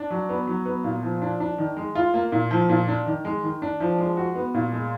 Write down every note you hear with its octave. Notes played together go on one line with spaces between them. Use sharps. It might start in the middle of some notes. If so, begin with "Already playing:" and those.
Already playing: D4
F#3
B3
F#3
B3
A#2
F3
D4
D4
D#3
G#3
F4
A#3
A#2
F3
A#2
D4
D#3
G#3
D#3
D4
F3
G#3
F#4
B3
A#2
G#3